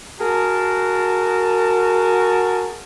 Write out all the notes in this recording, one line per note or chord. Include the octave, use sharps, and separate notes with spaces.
F#4 G#4 A#4 A5